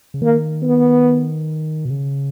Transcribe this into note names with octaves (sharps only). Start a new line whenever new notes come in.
C#3
D#3 A#3
B3
B2
C#3